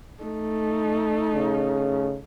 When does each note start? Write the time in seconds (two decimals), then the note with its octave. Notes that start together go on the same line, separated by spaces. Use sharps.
0.23 A3 D#4
1.35 C#3